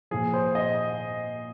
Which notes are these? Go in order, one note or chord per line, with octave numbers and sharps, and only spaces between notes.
A#2 F3 G#4
C5
D#5